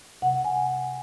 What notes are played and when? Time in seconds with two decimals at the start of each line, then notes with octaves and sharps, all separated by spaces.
0.22 C3 F#5
0.45 G#5